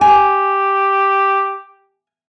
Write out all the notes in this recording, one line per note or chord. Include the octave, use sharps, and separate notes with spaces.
G4 G#5